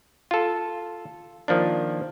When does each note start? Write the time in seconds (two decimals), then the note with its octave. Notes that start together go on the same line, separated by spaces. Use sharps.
0.31 F4 A4
1.48 D#3 F3 A#3 D4